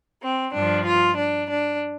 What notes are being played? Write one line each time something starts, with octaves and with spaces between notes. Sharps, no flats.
C4
G2 F3 D4
F4
D4
D4